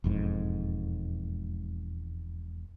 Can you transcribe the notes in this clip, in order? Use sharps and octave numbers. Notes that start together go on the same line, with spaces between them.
E1 F2 G#2